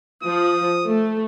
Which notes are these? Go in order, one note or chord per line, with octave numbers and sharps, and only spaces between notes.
F3 D#6
A3